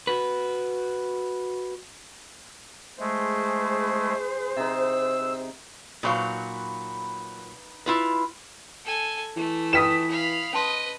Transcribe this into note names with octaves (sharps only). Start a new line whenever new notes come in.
F#4 B4
G#3 A3 G#4 C5
C3 D#4 E6
A#2 F#3 D#4 B4 F5 C#6
E4 F4 B4 B5
A4 G#5
E3 A3
F4 B4 G5 D#6 B6 E7
F5 B5
C#4 B4 D#5 A5 C6